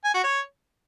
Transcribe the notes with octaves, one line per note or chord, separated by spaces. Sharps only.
G#5
F#4
C#5